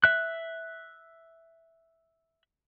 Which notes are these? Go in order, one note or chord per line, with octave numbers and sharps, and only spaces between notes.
E5 F#6